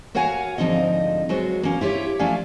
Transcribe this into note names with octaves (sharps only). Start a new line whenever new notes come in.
F#4 A#4 C#5 F5 F#5 G#5
D2 G#2 F3 C4 D#4 D#5
F#3 G#3 B3 F#4 C5 C#5
A#3 C#4
E4 F4 G4 C5 C#5
F3 A3 C#4 D5 F5 G#5